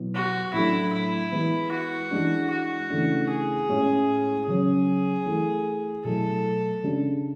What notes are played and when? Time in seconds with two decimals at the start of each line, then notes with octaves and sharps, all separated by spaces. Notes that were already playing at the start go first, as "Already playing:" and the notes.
Already playing: B2 F#3 B3 E4
0.15 F#4
0.54 A2 F#3 A3 D4 E4
0.93 E4
1.32 E3 G#3 B3
1.72 F#4
2.11 E3 G#3 D4
2.50 F#4
2.90 C#3 E3 A3 D4
3.30 G#4
3.69 A2 G#3 C#4 E4
4.47 C#3 F#3 C#4 G#4
5.26 E3 A3 E4
6.05 B2 F#3 A3 E4 A4
6.84 C#3 G#3 D4